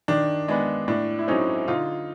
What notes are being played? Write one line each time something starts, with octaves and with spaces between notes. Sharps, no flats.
D#3 D4
G#3 B3 D4
A2 D4
E4
F#3 A3 C4 C#4 D#4
D3 D#4 F4